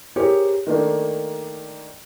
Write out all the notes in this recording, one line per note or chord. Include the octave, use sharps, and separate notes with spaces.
G4 G#4 A#4 C5 C#5
D#3 A3 A#3 D4 D#4